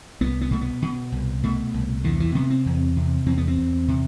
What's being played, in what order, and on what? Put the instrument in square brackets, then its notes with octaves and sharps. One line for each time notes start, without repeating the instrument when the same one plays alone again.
[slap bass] C2 B3
B3
B2 A3
B3
B2
C2
B2 A3
C2
E2 D3
E3
C3 B3
C4
E2
C3
E2 C4
B3
C4
E2
C3